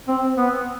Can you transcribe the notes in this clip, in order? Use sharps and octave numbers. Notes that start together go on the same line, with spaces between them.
C4
B3